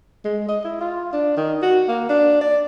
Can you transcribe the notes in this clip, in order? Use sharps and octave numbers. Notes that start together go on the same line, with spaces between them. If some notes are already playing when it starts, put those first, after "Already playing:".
G#3
D#5
E4
F4
D4
D#3
F#4
A#3
D4
D5